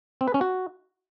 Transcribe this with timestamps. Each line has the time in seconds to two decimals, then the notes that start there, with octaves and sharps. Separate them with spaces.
0.21 C4
0.28 B4
0.34 C#4
0.41 F#4